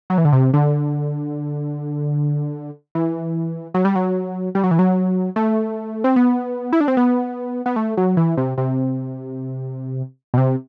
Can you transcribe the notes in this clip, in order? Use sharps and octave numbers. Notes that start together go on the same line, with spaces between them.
F#3
E3
D3
C3
D3
E3
F#3
G3
F#3
G3
F#3
E3
F#3
A3
C4
B3
E4
D4
C4
B3
B3
A3
F#3
E3
C3
C3
B2
C3